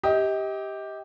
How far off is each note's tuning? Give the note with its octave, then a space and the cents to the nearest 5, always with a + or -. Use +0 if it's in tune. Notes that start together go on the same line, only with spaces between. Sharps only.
G4 +0 D#5 +35